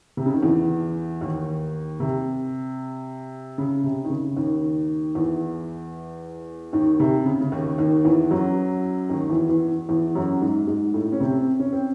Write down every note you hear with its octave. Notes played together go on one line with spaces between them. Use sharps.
C3
C#3
D#3
E2 E3
D#2 D#3
C3
C#3
C3
D#3
C#3
D#2 D#3
E2 E3
D#2 D#3
C3
C#3
C#3
D#2 D#3
D#2 D#3
E2 E3
F#2 F#3
D#2 D#3
E2 E3
E2 E3
E2 E3
F#2 F#3
G#2 G#3
G#2 G#3
A2 A3
C#4
C3 C4
C#4
C4